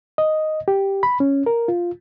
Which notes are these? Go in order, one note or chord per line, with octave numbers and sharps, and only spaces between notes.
D#5
G4
B5
C#4
A#4
F4